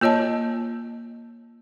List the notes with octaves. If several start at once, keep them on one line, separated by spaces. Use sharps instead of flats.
A#3 F4 C#5 D#5 A5